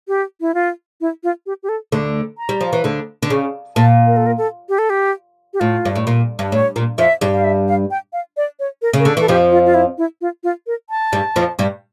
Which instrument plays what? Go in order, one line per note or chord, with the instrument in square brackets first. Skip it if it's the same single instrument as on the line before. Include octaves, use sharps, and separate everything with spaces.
[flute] G4
E4
F4
E4
F4
G4
G4
A4
[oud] D2 D3
[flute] A#5
[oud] G3
F3
E3
D2 D3
D3
C#3
[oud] A#2 [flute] A5
[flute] A#4
A4
A#4
A4
G4
A4
G4
G4
[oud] A2 [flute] F4
[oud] G2
A2
A#2
G2
[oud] A2 [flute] C#5
[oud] A#2
[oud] F2 F3 [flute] E5
[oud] G2 G3
[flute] F5
E5
F5
G5
F5
D5
C#5
A#4
[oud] C#3
[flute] A#4
[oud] D3 [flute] A4
[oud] E3 [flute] A4
[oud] F2 F3 [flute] G4
[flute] F4
F4
E4
E4
F4
F4
A#4
A5
[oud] G2 G3
F2 F3
G2 G3